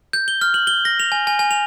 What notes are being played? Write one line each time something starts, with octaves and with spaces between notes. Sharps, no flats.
G6
G7
F6
F#7
G7
A#6
F7
G#5
G#5
G#5
F7